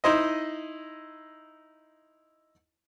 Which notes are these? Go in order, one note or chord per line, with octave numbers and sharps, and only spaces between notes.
D#4 E4 C5 D#5